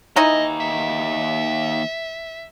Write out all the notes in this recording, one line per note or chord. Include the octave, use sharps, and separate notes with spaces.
D#2 E3 D#4 E4 D#5 A#5
E5